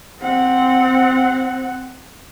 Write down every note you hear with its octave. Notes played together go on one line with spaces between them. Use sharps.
C4 F#5